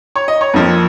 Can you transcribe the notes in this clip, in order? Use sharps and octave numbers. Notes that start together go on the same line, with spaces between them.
C#5
D#5
C#5
F2 F3 A#3